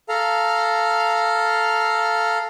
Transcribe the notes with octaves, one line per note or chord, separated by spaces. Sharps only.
A4 F5 A#5